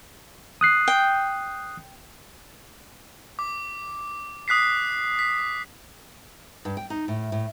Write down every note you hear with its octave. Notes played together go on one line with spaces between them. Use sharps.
D#6 F#6 C7
G5
D6
D#6 F#6 B6 C7
B6
G2
G5
D#4
A2
A2